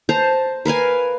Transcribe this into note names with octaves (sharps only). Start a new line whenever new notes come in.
C5 A5 A#5
A#4 B4 F5 G#5